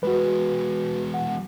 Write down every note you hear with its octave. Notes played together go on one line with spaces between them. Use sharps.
E2 G#3 F#4 B4
F#5